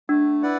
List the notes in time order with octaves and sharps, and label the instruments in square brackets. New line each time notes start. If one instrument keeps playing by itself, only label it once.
[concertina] A3 [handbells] D4
[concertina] E4 B4 D5 F#5